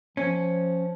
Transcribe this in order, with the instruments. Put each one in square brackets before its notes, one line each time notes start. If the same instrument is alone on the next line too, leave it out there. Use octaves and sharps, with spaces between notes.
[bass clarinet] F3 [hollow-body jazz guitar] C#4